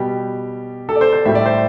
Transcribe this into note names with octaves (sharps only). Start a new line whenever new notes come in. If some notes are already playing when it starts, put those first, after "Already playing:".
Already playing: B2 G3 G4
A4
D5
C5
C5
A2 G3 E5
D5
C5